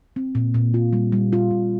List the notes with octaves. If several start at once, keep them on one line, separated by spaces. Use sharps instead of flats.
C4
A#2
A#2
F4
G3
G3
F4
A#2